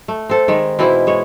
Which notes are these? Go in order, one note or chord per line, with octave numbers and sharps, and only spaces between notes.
A3
C4 A4
D#3 G#3
B2 E3 C4 E4
G#3 C#5